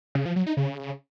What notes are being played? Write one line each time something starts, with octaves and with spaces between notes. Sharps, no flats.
C#3
F3
F#3
D#4
C#3